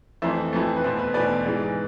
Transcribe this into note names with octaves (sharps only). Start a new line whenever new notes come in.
F2 E3 A3 C5 E5
F2 E3 A3
B4
E2 B2 A3 C5
B4
E2 B2 A3 B4 D5
G#2 E3 G#3